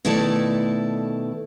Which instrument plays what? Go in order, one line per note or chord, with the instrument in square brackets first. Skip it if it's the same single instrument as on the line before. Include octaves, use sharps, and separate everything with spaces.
[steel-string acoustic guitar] B2 D#3 A3 E4 A4 D5